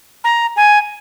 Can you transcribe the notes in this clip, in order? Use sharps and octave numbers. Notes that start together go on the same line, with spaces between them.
A#5
G#5